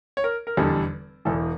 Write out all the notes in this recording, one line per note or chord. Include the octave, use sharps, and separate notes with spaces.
C#5
A#4
A#4
F1 E2 D3 G3 A4
E1 E2 E3 A4